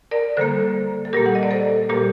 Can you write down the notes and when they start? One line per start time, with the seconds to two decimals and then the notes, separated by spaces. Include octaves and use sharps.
0.11 A#4 D5
0.37 D3 G3 A#3 A4 C5
1.05 A4
1.13 A#2 G3 A#3 G4 A#4
1.26 F#5
1.35 D#5
1.43 D5
1.51 A4 C5
1.89 A#2 G3 A#3 G4 A#4